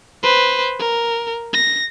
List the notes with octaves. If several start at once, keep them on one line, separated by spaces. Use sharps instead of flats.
B4 C5
A#4
A#6